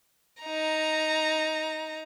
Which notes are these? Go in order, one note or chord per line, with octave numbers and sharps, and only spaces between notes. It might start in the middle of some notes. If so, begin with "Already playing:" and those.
D#4 A#5